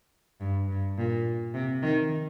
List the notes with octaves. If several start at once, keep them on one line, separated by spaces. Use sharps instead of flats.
G2
G2
A#2
C3
D#3